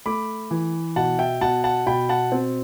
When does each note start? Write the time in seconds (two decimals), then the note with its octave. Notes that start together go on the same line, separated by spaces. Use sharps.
0.06 A3 B5 D6
0.51 E3
0.96 B2 F#5 A5
1.19 E5 G5
1.41 B2 F#5 A5
1.64 F#5 A5
1.87 B2 G5 B5
2.09 F#5 A5
2.32 C4